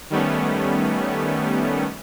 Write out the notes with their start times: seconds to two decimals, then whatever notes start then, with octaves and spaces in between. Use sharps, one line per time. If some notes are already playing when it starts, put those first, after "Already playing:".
0.10 D#3 G3 A3 B3 C#4